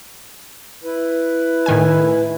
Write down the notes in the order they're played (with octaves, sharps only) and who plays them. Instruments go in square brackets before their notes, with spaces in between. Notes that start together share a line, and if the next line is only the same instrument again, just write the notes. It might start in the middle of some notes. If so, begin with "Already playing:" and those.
[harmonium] E4 B4
[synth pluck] A2 D#3 G#5